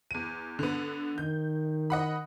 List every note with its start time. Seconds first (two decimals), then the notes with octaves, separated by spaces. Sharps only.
0.11 E2 D#7
0.59 D3 B3
1.18 D#3 G6
1.90 D#5 F#5 B5